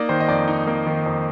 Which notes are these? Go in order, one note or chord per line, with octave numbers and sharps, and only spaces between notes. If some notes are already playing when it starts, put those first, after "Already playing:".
Already playing: A#3 D#4 D5 D#5
D#3 C5
D#5
F2 D5
D#4 D#5
A#3
D#3
F2